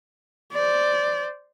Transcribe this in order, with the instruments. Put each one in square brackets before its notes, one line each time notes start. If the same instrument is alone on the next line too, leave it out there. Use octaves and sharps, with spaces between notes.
[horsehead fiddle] C5 D5